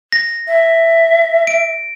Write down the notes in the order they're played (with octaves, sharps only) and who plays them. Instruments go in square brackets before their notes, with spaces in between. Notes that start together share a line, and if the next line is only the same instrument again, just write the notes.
[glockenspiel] A#6
[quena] E5
[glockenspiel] D7